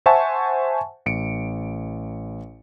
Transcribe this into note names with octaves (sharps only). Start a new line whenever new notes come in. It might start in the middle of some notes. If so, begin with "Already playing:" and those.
C5 E5 F#5 G#5 A5 C#6
A1 C#7 D7